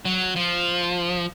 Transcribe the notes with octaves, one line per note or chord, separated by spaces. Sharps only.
F#3
F3